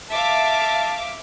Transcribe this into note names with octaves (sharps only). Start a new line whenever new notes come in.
E5 F5 A5 D6